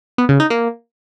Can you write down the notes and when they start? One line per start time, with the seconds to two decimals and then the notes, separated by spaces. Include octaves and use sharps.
0.18 B3
0.29 C#3
0.40 D#4
0.50 A#3